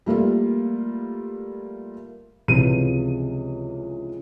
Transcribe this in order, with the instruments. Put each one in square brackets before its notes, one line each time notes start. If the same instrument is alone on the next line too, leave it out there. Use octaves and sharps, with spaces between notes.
[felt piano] G3 A3 A#3 F4
[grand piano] C#2 C3 E3 F3 G#4 D#7